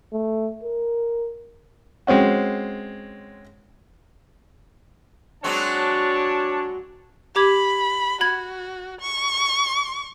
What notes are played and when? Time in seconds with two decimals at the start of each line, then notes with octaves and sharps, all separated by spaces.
0.13 A3
0.63 A#4
2.07 G#3 C4 C#4 F#4
5.44 F#3 G#3 C4 D4 C#5 A5
7.36 G4 B5 D6 G#6
8.21 F#4 B5 G#6
9.00 C#6